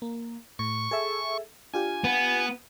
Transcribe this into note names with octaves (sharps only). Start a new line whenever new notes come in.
A#3
A2 C#6
G#4 A4 E5
D4 F4 G4 G#5
B3